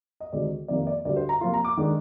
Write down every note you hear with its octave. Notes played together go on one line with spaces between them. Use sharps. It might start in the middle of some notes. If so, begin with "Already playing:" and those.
D#5
D2 C3 D#3 G#3 D5
F2 C3 D#3 A#3 D5
D5
D2 D3 G3 D5
C5
A#5
C3 F3 A#3 F4 C6
A#5
D6
D#3 G#3 D4